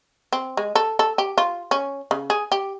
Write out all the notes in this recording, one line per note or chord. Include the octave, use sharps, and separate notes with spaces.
C4
G#3
A4
A4
G4
F4
C#4
C#3
G#4
G4